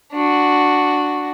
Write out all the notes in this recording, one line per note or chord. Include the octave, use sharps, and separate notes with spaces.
D4 F#4